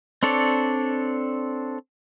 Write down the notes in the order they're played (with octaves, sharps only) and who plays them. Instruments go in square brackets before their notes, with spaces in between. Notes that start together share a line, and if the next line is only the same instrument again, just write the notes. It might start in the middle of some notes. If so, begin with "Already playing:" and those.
[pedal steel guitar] C4 D4 A4 C#5 D5